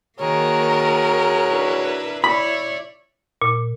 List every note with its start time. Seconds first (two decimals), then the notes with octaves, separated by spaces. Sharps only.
0.20 D#3 A#3 F#4 G#4 A#4 C#5
1.49 D4 E4 B4
2.24 E4 C#5 D5 B5
3.42 A#2